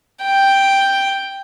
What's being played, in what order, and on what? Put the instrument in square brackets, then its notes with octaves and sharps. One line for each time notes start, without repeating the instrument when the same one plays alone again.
[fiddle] G5